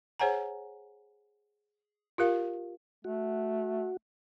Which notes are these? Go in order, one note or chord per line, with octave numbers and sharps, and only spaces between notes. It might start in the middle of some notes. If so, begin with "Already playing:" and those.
G#4 C5 C#5 F#5 G#5 A#5
F4 G4 A#4 F5
A3 F#4